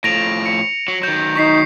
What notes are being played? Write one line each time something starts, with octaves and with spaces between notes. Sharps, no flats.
A2 F3 A#6 D7 F7
C#7
F#3
D#3 F#3 G6
D#4 C#6 B6 C7